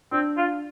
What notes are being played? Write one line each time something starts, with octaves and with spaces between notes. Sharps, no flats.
C4 D4
F4